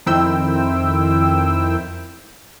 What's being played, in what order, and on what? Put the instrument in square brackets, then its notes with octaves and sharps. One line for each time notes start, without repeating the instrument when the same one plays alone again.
[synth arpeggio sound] F2 D#3 C4 E4 G5 E6